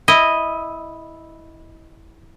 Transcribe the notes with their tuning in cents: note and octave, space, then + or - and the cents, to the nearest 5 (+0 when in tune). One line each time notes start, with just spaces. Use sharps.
E4 -10 D#5 +0